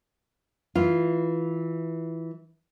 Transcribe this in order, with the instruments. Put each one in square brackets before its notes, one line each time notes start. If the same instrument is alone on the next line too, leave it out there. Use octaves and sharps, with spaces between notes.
[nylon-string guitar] E3 F4